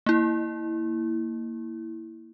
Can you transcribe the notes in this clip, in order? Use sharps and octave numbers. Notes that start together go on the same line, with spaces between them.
A#3 E4